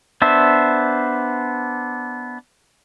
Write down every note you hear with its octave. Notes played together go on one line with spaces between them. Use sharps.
B3 D4 C5 E5